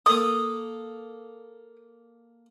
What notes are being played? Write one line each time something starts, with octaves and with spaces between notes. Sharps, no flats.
A#3 A4 D#6